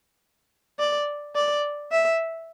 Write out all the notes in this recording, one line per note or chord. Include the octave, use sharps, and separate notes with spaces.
D5
D5
E5